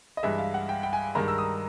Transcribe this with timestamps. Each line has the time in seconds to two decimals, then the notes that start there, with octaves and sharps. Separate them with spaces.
0.17 D#5
0.23 G2 E3 G#3 E5
0.38 F5
0.54 F#5
0.69 G5
0.83 G5
0.93 G#5
1.15 G2 D#3 G#3 A#5
1.28 E6
1.38 D#6